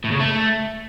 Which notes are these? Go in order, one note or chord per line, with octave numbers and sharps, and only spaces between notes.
A2
C#3
A3